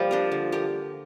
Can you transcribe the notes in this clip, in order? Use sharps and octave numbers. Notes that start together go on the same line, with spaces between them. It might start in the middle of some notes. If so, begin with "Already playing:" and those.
Already playing: F3 G3 A#3
D4 G4 A#4
D3
A#3 G4 A#4